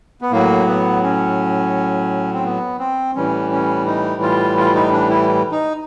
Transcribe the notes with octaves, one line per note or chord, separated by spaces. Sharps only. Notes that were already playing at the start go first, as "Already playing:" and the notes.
B3
A2 F#3 A#3
B3
C#4
C4
B3
C4
A2 E3 G3 C#4
C#4
D#4
F4
F4
D#4
D4
E4
D#4